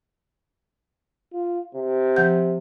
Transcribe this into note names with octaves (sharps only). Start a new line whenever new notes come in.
F4
C3
F3 F#5 G6